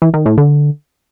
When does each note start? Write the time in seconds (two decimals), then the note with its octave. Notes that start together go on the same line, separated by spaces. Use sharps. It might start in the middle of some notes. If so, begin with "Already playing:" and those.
0.02 E3
0.14 D#3
0.26 A2
0.38 D3